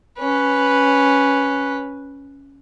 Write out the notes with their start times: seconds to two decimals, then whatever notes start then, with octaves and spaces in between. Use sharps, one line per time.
0.19 C#4 B4